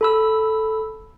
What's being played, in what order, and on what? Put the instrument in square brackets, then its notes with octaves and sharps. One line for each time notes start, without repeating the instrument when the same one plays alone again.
[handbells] A4 B5 E6